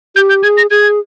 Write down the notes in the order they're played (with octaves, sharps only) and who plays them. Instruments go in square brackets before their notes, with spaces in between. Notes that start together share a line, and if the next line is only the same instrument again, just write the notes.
[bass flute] G4 [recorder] G6
[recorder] G6
[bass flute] G#4 [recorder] G#6
[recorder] A#6
[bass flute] G#4 [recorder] G#6